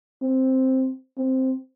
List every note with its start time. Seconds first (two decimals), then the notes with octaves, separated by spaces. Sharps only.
0.22 C4
1.18 C4